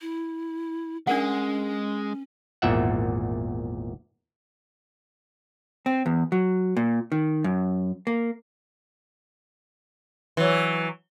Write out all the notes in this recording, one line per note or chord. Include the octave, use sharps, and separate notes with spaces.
E4
G#3 C#4 D4 A#4 F#5
G#1 E2 A#2 E5 F#5
C4
E2
F#3
A#2
D#3
F#2
A#3
E3 F#3